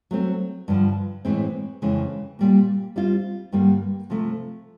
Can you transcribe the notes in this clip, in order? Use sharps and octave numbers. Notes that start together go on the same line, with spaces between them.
F#3 A3 C4
G2 D3 F3
A2 E3 G#3 C4
F2 C#3 E3 G#3
A#2 G3 A#3
G3 C4 F4
G2 D3 G3 A#3
C3 F3 A3